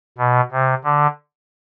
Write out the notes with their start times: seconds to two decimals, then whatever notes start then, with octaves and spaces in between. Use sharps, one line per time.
0.18 B2
0.52 C3
0.84 D3